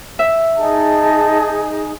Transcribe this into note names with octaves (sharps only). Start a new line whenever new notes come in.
E5
D#4 G#4 A5